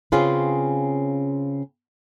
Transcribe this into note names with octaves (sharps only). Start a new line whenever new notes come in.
C#3 C4 C#4 F4 G#4 B4